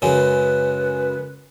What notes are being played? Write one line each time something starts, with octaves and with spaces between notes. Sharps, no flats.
F#2 C#3 G#3 B4